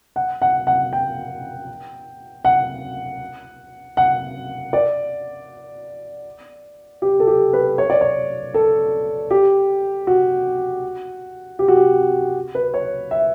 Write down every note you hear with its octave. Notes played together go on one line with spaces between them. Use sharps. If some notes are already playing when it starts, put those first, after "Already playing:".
F#5
F#5
F#5
G5
F#5
F#5
D5
G4
A4
G4
B4
C#5
D5
C#5
A4
G4
F#4
G4
F#4
G4
B4
C#5
E5